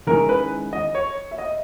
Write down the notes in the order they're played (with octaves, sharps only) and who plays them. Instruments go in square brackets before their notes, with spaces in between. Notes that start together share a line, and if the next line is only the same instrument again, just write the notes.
[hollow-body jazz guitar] D#3 G#3 C#4 E4 G#4 [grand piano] A#4
[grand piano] B4
D#5
C#5
E5
D#5